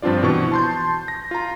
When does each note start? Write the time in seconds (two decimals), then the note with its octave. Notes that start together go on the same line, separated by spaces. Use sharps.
0.02 G2 F3 C4 D4 F4 D5
0.23 B2 E3 C#6
0.52 A5 C6 G6
1.08 A#6
1.31 F4 A#5